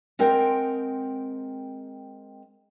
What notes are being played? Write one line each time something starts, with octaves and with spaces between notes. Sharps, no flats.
G#3 C4 A#4 F#5 G5